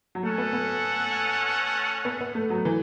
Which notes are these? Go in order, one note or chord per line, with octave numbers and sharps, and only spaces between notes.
F#3
A3 C#4 A4 F#5
B3
B3
B3
B3
A3
F#3
E3